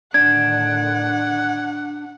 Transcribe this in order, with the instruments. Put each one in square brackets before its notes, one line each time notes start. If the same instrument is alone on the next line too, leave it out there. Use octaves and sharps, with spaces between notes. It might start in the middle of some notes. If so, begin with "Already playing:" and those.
[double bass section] A2 D3 D#3 [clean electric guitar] D4 [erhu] F#5 [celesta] G#6